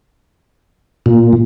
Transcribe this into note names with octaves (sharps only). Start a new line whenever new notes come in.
A#2